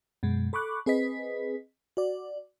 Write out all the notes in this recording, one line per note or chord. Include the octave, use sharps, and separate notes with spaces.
F#2 B2 G#3
A4 B5 C#6 D6 F#6
C4 G#4 B4 D#5 B6
F#4 D5